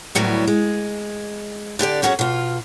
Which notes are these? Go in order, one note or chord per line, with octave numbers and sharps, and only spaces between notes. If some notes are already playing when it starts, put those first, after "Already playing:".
D2 A2 F#3 G3 B3
G#3
D3 D4 G4 D5
F#2 C#4 F#4 G#4 C5 C#5
B2 F4